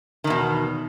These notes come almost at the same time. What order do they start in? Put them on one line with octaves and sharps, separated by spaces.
D#3 E2 B2